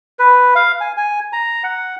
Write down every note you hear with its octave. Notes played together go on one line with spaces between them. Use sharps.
B4
F5
G#5
G#5
A#5
F#5